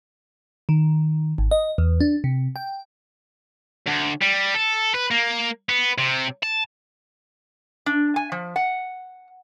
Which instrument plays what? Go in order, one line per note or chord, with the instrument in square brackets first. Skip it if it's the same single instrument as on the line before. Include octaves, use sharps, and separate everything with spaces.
[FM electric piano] D#3
G#1
D#5
E2
D4
C3
G5
[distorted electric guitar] D2
G3
A4
B4
A#3
B3
C3
A5
[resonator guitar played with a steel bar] D4
G#5
F3
F#5